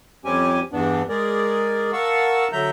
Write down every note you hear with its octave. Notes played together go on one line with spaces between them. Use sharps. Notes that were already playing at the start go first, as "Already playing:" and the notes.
F2 G3 C4 C#4 G4 G#5
E2 G2 E3 B3 D4
G#3 G#4 A#4 D5
A#4 F5 F#5 A5 C#6 E6
D3 F#3 E5 A#5 G6